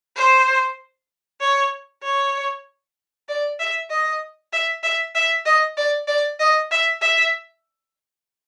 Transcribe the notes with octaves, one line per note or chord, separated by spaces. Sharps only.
C5
C#5
C#5
D5
E5
D#5
E5
E5
E5
D#5
D5
D5
D#5
E5
E5